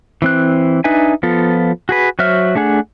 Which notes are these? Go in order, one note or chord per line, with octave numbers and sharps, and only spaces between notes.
E3 C4 F#6
D4 D#4 B4 E5 G#5
F3 B3 F4 A4
F#4 G#4 B4
F#3 F#4 C5 E5 F6
A3 D4 G#4 F#5